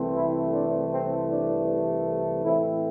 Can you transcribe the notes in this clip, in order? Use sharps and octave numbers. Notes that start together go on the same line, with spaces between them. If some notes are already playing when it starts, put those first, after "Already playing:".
Already playing: C2 C3 E3 A3 C4
E4
D4
C4
D4
A2 E3 A3 C4 E4